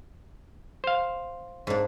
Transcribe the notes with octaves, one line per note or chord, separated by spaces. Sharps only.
C5 F5
G#2 A#3 D4